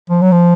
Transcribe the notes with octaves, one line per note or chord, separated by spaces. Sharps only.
F3
F#3
F3